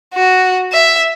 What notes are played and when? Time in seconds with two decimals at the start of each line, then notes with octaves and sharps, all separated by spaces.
0.13 F#4
0.72 E5